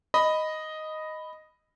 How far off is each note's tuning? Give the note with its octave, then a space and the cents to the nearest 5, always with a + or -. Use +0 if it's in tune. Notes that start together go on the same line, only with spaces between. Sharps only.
D#5 +0 B5 +5